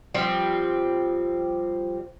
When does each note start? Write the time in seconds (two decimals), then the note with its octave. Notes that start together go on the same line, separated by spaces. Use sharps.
0.14 F3 G3 C4